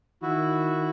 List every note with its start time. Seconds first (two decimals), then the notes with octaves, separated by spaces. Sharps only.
0.22 D#3 E4 F#4